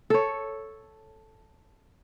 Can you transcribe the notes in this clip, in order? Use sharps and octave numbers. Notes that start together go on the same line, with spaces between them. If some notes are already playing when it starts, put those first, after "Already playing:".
A4 C#5